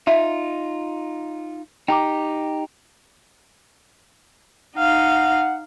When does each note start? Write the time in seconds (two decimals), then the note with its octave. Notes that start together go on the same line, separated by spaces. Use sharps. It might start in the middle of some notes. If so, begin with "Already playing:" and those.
0.07 D#4 F4 E5
1.88 D#4 G4 G5 A#5 D6
4.77 D#4 F5 F#5